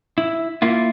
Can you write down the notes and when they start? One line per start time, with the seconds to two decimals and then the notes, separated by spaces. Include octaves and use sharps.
0.18 E4
0.62 A#3 E4 F4